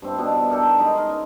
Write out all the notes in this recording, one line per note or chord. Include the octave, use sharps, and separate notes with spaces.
G2 C4 E4
B2 D4
G4 A4 A#4 D5
G#3 D#4 A#5 B5
A#4 C6
C#4 G#5